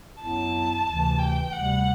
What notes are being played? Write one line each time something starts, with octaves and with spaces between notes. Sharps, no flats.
F#2 F#3 B3 E4 A5
D2 C3 E3
G5
D2 C3 G3 F#5